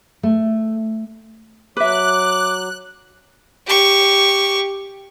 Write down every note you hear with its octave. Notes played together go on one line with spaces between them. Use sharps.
A3
F#3 B4 E5 D6 F#6
G4 C#6